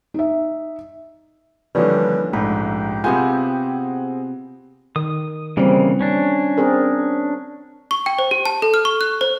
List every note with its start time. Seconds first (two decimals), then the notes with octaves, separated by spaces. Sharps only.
0.14 D#4 E5
1.75 G2 D3 E3 F3 G3 A#3 C#4 G4
2.33 A#1 G#2 G#3 A3 G4 B4
3.04 C3 B3 C4 F4 G#4 F#5 G#5 G6
4.96 D#3 D#6
5.57 C#3 E3 G3 A#3 C4
6.01 C#4 D4
6.58 C4 G#4 A#4
7.91 C#6
8.06 G5
8.19 C5
8.31 G4
8.45 A5
8.62 A4
8.74 F6
8.85 C#6
9.01 F#6
9.21 C5